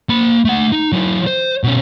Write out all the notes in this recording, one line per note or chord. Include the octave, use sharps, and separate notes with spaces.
A#3 B5
A3 F#5
D#4
F#3 E4
C5
B2 C#4